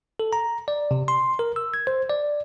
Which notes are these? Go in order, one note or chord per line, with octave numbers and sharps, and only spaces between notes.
A4
A#5
D5
C3
C6
A#4
E6
G#6
C5
D5